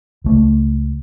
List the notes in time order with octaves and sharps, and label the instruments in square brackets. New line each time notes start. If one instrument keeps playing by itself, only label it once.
[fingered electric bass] C#2 A3